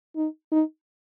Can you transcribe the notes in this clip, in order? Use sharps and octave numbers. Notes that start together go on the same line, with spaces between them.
D#4
D#4